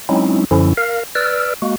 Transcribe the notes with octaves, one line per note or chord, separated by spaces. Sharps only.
F#3 G#3 C4 C#4 D#4 E4
F#2 D3 F3 C#4 E4
A#4 F5
B4 D5 E6 F6
G#3 A#3 F#4